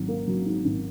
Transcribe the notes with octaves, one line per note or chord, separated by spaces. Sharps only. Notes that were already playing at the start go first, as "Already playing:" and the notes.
Already playing: G#1 F#3
A#3
F#3
G#2
G#1